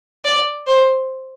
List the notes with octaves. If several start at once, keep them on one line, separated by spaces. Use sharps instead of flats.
D5
C5